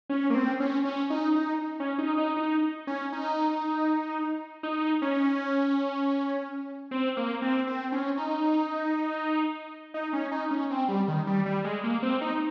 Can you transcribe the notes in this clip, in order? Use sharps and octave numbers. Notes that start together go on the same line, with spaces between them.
C#4
A#3
C4
C#4
C#4
D#4
D#4
C#4
D#4
D#4
D#4
C#4
D#4
D#4
C#4
C4
A#3
C4
C4
C#4
D#4
D#4
C#4
D#4
C#4
C4
G3
D#3
G3
G3
G#3
A#3
C4
D#4